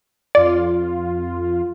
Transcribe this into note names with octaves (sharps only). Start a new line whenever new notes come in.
F2 F4 D5